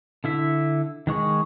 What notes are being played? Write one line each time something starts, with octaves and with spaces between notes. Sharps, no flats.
D3 E4 E5
D#3 G#3 C#6